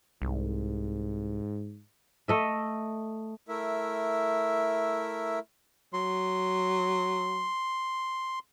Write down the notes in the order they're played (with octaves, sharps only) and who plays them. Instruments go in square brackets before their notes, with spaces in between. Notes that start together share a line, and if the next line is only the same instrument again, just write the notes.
[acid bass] C2 [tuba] G#2
[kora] A3 D#5 E5
[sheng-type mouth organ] A3 E4 A#4 E5
[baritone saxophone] F#3 [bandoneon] C6